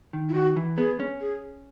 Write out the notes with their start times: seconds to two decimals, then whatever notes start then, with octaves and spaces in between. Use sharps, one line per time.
0.13 D#3
0.29 E4
0.34 D#3 F#4
0.57 E3
0.77 B3 G#4
1.00 C#4
1.21 G#4